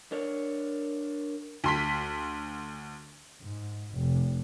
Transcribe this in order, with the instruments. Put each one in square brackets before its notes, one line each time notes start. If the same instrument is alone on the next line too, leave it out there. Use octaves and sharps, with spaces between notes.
[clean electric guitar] D4 A#4 C#5
[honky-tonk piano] D2 C6 B6
[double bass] G#2
F1